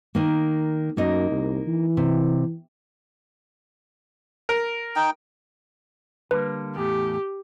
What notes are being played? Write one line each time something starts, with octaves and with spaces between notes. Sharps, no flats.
D#3 A#3
F#2 A#3 D#4 D#5
C2
E3
C3
A#4
D#4 G5
D3 G3 A#3 B4
E2 A2 A3 G4